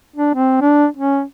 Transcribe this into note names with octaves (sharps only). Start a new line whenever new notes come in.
D4
C4
D4
C#4